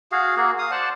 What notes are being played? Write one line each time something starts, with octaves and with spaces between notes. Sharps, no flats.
F#4 G#4 F5
A#3 F#4 G#4
F5 D#6
C5 D5 F#5 A5